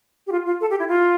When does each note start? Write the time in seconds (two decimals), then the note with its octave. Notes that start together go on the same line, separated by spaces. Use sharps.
0.27 G4
0.32 F4
0.46 F4
0.61 A4
0.70 G4
0.79 E4
0.88 F4